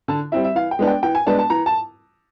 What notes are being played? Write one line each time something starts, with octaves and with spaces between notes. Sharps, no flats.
D3 A5
G3 C4 E4 E5
E5
E3 F5
G5
G#3 B3 D4
G5
E3 G5
G#5
G#3 B3 D4 A5
A5
E3 A#5
A5